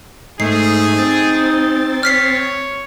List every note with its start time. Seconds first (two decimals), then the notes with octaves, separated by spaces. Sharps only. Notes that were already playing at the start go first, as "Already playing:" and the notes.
0.40 G#2 A3 D#4 G#4 C7
0.98 C4 A6
2.03 C#5 F6 B6 C7